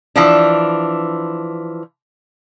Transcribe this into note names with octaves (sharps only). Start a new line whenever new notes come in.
E3 F3 D4